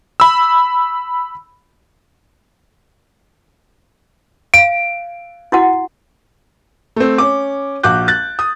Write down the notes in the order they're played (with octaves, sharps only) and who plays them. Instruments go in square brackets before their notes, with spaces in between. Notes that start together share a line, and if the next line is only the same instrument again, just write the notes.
[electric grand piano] B5 E6
[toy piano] F5 [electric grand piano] D7
[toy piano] E4 F#4 F#5
[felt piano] A3 C4
C#4 D6
A#1 F#4 D6 F#6 G6
F#6 A6
D#6